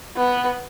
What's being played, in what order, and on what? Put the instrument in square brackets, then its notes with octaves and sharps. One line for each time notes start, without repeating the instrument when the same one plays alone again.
[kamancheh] B3